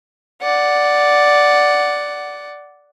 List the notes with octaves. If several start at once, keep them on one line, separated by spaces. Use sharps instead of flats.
D5 F#5